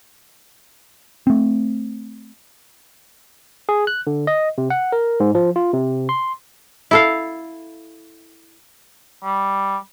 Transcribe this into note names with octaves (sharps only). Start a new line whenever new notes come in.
A3 C4
G#4
F#6
D3
D#5
C3
F#5
A#4
G#2
F3
F4
C3
C6
E4 A4 F5
G3